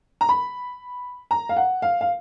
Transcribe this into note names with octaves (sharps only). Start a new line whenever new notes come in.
A#5
B5
A#5
F5
F#5
F5
F5